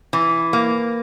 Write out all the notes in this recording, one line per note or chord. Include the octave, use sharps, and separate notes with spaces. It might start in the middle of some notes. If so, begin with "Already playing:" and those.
E3
A#3